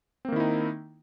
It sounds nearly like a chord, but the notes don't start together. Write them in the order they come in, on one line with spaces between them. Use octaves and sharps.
C4 A#3 D#3 E4 D#4